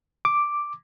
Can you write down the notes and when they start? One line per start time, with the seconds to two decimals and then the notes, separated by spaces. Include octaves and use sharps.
0.25 D6